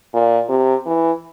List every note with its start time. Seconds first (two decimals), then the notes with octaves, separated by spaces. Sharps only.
0.14 A#2
0.49 C3
0.86 E3